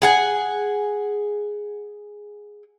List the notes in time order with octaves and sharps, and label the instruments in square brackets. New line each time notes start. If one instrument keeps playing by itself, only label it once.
[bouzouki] G#4 F#5 G#5